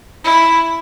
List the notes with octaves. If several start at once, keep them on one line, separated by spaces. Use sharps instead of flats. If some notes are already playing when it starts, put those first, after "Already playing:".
E4